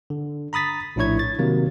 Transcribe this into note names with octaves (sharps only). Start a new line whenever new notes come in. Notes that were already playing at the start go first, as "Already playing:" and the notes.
D3
A#5 B5 D#6 A6 B6
A#1 A2 D4 E4 C#5 G#6
A6
C3 D#3 F#3 A#3 C4